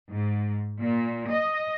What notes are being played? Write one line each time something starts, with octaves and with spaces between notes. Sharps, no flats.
G#2
A#2
D#5